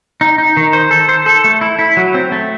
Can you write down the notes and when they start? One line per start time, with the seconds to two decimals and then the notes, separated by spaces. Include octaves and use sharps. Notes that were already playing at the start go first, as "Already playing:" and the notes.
0.21 D#4
0.38 D#4
0.57 D#3
0.73 C5
0.91 A4
1.09 C5
1.26 A4
1.44 A3
1.61 E4
1.79 E4
1.97 F#3
2.14 C4
2.32 A3